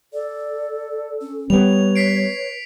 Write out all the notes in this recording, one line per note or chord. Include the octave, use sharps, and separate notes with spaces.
A4 D5
C#4
G3 B3 B4 C#5 F7
B6 C7 D7